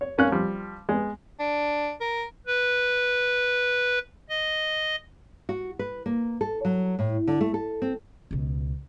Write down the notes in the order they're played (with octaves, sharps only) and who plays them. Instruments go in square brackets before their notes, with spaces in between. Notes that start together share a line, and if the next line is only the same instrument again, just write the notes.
[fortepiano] C#5
G#1 A#3 C#4 F5 F#6
F3 G3
G#3 B3
[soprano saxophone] D4
A#4
[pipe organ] B4
D#5
[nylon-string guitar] F#4
B4
A#3
A4
F#3
A2
D3
A3
A4
C4
[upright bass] C#2 B2